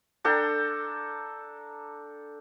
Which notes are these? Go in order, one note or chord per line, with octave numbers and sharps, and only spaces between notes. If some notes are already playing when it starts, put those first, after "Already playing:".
D4 A4 G5 A#5